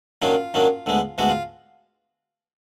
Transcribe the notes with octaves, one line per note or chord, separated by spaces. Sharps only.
F#2 D#3 F#3 A#3 D4 F4
F#2 D#3 F#3 A#3 D4
D2 D3 G#3 B3
D2 D3 G#3 B3 F#4
F4